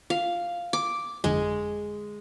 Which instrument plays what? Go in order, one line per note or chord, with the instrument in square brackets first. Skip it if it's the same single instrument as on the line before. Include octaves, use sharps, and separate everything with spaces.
[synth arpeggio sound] F4 [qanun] F5
[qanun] D6
[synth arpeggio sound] G1 F2 D3 [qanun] G#3